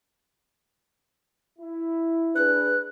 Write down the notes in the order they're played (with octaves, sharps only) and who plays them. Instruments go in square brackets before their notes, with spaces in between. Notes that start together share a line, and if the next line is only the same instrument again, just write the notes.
[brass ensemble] E4
[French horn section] D4 G#4 B4 [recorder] F#6